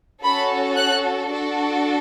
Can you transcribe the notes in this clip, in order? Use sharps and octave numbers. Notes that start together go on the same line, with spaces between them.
C#4 F#4 A4 B5
F#6
D4 F#4 A4